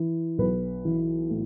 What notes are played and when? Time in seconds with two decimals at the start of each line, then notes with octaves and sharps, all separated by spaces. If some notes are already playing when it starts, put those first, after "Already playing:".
Already playing: E3
0.38 B1 B4
0.85 E3
1.30 A2